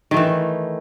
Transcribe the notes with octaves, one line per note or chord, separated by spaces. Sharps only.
D#3 E3 A3